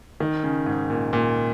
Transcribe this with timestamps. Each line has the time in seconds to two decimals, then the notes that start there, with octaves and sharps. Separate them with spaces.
0.20 D#3
0.43 C#3
0.66 G#2
0.90 A#2
1.13 A#2